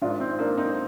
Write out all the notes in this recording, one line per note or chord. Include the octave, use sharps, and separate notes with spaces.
G#2 D#3 D4 F4
C4
A#3 D4
C4 D#4